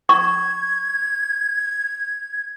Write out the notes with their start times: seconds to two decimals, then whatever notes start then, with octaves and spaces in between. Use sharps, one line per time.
0.09 C#6 G#6